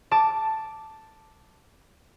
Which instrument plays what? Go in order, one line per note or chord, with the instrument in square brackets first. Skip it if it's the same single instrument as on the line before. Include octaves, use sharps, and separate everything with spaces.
[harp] A5 D6